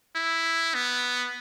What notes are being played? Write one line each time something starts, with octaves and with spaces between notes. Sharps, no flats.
E4
B3